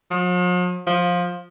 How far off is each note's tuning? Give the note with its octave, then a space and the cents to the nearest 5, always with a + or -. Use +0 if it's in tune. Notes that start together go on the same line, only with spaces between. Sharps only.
F3 +45
F3 +15